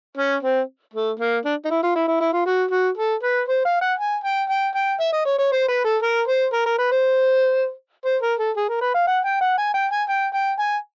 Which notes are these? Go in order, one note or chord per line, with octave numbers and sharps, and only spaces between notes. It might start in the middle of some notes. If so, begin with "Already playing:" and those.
C#4
C4
A3
A#3
D4
D#4
E4
F4
E4
E4
E4
F4
F#4
F#4
A4
B4
C5
F5
F#5
G#5
G5
G5
G5
E5
D#5
C#5
C#5
C5
B4
A4
A#4
C5
A#4
A#4
B4
C5
C5
A#4
A4
G#4
A#4
B4
F5
F#5
G5
F#5
G#5
G5
G#5
G5
G5
G#5